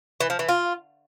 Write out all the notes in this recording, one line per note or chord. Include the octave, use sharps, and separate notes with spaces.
E3
F3
E3
F4